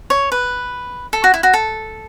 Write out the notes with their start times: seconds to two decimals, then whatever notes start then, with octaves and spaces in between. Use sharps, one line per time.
0.10 C#5
0.32 B4
1.13 A4
1.24 F#4
1.34 E4
1.43 F#4
1.53 A4